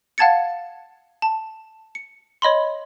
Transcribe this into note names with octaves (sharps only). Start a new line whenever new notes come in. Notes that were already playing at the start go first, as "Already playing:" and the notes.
F5 F#5 A5 G#6 A6 C#7
A5
C#7
C#5 D#5 B5 C6